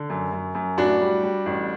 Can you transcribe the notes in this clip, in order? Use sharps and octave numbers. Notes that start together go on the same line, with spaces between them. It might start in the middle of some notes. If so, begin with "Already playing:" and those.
Already playing: D3
F#2
F#2
F#2
A2 D4 F#4
G3
G3
A1